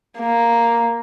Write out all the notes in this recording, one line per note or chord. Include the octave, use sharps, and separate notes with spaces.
A#3